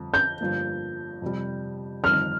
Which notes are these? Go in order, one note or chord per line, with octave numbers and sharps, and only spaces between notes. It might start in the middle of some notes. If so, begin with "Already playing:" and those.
Already playing: G1 F2
G6
G1 G2 F3 A#3
F2 C3 G3
G1 F2 D#3 F6